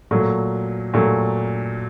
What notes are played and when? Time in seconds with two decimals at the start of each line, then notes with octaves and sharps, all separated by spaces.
0.11 A#2 F#3 A3
0.94 A#2 F#3 A3